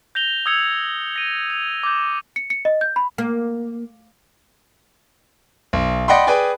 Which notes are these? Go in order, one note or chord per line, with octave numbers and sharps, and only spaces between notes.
G6 A#6 F7 G7
D#6 E6 G#6 C#7 F7
A#6 D#7
F7
D6 G6
C#7
C#7
D#5
G6
B5
A#3
B1
D5 D#5 F#5 G5 B5 C6
G#4 B4 D5 G5 G#5